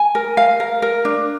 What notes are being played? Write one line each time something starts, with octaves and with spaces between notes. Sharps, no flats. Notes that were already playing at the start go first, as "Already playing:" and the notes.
Already playing: G#5
A#4
F5
A#4
A#4
D4